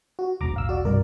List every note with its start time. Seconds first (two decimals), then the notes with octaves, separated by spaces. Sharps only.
0.19 F#4
0.41 E1 B1 A#5 D6
0.54 A1 F5 E6
0.69 F#4 D5
0.85 C2 G2 A#4 D5